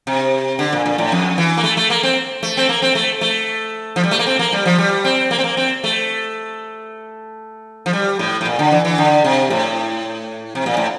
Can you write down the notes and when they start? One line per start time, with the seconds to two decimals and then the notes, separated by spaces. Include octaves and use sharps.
0.07 C3
0.59 D3
0.73 A#2
0.86 A#2
0.98 A2
1.12 F2
1.38 E3
1.57 A#3
1.64 A3
1.77 A3
1.90 A#3
2.03 C4
2.43 A3
2.57 C4
2.69 A#3
2.82 C4
2.95 A3
3.21 A3
3.96 F3
4.04 G3
4.11 A3
4.19 A#3
4.26 C4
4.39 A#3
4.52 G3
4.66 F3
4.78 G3
5.05 C4
5.31 A#3
5.39 C4
5.44 A#3
5.57 C4
5.84 A3
7.86 F3
7.93 G3
8.19 A2
8.41 A2
8.46 A#2
8.59 D3
8.72 E3
8.85 E3
8.98 D3
9.24 C3
9.50 A2
10.55 C3
10.66 A#2
10.77 A2